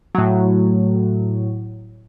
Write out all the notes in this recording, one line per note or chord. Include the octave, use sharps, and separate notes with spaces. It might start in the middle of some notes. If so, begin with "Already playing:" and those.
A2 F#3